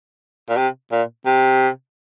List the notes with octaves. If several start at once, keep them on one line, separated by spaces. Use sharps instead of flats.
A#2
C3
A#2
C3